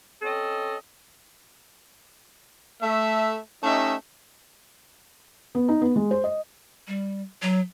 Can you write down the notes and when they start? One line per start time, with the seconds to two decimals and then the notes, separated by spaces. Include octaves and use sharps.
0.22 C4 C#4 A4 D#5
2.82 A3 E5
3.63 A3 C#4 D#4 G4 D#5 E5
5.55 B3
5.68 D#4
5.82 B3
5.96 G#3
6.11 C5
6.24 D#5
6.88 G3
7.42 F#3